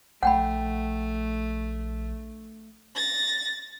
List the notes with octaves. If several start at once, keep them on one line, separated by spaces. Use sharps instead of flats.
A#1 A3 F#5 G5 B5
A6 A#6